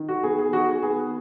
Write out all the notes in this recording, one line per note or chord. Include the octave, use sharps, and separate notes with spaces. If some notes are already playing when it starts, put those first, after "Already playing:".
Already playing: D#3
F#4
B3 G#4
G#4
D#3 F#4
G#4
B3 G#4